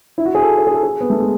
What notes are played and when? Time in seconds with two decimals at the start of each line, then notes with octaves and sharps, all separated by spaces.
0.18 E4
0.25 F#4
0.35 G#4
0.43 A4
0.58 A4
0.67 G#4
0.74 A4
0.83 G#4
1.01 B3
1.10 A3
1.20 G#3